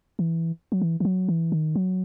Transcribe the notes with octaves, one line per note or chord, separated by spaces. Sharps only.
E3
F#3
E3
E3
F#3
E3
D#3
F#3